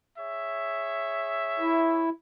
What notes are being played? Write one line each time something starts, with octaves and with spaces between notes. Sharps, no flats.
G#4 C#5 E5
E4